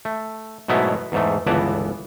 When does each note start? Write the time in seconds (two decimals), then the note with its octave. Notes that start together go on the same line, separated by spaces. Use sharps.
0.05 A3
0.68 G#2 B2 F#3 A3 B3 E4
1.12 E2 G#2 A3
1.46 G1 C#2 E3 B3 D5 A5